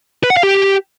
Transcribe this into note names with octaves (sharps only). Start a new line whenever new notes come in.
B4
F#5
F5
G4